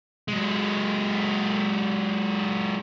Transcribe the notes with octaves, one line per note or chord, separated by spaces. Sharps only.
F#3 G#3